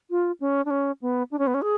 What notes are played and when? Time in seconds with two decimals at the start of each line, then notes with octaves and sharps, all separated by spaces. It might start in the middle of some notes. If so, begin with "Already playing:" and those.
0.10 F4
0.40 C#4
0.65 D4
0.70 C#4
1.02 B3
1.31 D4
1.39 C#4
1.47 B3
1.54 C#4
1.62 G#4